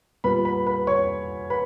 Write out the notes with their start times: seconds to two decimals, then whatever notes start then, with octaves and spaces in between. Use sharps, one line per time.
0.24 A#2 G3 B3 B4 B5
0.45 B4 B5
0.67 B4 B5
0.87 C#5 C#6
1.50 B4 B5